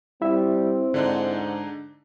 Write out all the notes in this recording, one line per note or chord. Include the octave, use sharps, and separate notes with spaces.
G3 C4 E4 E5
G#2 D3 D4 D#4